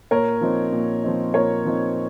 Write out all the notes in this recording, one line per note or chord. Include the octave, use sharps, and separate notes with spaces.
A#2 A#4 C#5
F3 C4 D#4
A#2
F3 C4 D#4
A#2 A#4 C#5
F3 C4 D#4